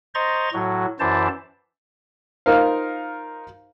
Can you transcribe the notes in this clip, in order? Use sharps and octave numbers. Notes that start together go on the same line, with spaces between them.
C5 D#5 A#5 C6 C#6 A6
A2 F#3 F#4
F#2 E3 E4 C5 D5 A5
D#4 F4 A#4 C5 F5